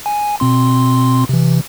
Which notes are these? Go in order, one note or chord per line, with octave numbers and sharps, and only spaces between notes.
G#5
B2 C4 C6
C3 E3